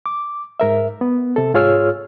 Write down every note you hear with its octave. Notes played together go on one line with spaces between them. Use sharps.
D6
G#2 A#4 E5
B3
C3 A4
G#2 F4 G#4 C#5 E6 F6